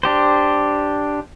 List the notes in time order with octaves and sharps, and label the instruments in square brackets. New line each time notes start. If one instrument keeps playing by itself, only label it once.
[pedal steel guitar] D4 G4 C5